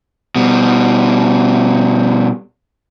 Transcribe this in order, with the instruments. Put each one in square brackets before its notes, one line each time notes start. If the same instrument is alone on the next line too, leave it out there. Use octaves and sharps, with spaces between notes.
[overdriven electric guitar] B2 G3